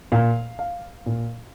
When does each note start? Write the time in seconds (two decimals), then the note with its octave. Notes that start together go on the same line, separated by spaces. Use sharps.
0.12 A#2 F5
0.59 F5
1.06 A#2